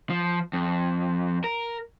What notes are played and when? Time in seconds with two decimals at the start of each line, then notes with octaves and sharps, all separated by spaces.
0.10 F3
0.53 F2
1.44 A#4